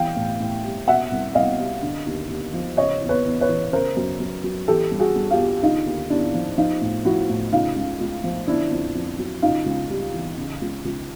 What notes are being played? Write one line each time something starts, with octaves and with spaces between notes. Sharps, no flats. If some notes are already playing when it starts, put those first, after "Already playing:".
Already playing: E3 G3 F5 G5
A2
A2
G3
B2 E5 F#5
C2
C2 D#5 F5
G3
D3
D#2
D#2
F3
C#3 C#5 D#5
E2
B4 C#5
E2
B4 C#5
E3
C#3 A#4 C5
F#2
F#2
F#3
E3 G4 A4
G2
F#4 G#4
G2
F4 G4
G3
D3 D#4 F4
D#2
D#2 D4 E4
F3
F3 D#4 F4
A2
F3 E4 F#4
A2
C#3 D#4 F4
C#2
C#2
F3
D3 D4 E4
F2
F2
F#3
C#3 D#4 F4
C#2
G3
E3
C#3
C#2
C#2